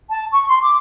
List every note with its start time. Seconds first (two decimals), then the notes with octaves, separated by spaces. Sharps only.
0.10 A5
0.31 C#6
0.48 C6
0.62 D6